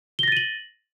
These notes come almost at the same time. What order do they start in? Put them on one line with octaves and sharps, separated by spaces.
G7 A#6 A6 D#7 F#7